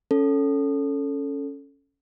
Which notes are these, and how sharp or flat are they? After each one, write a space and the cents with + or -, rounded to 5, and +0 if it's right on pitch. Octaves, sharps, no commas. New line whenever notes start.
C#4 +0 A4 +0